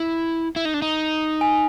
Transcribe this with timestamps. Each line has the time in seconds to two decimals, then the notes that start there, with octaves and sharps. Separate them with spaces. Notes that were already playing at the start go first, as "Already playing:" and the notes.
Already playing: E4
0.56 E4
0.65 D#4
0.74 D4
0.82 D#4
1.41 G#5